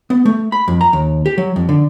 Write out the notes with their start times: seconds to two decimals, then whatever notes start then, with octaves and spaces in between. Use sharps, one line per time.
0.10 B3
0.26 A3
0.52 B5
0.68 F2
0.81 A#5
0.93 D#2
1.26 G4
1.38 F#3
1.56 F2
1.69 D3